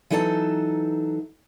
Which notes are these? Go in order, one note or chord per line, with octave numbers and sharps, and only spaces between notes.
E3 F#3 D#4 A4 D5 A5